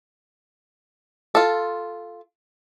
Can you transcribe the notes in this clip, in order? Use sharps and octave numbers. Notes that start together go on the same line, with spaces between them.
F4 A4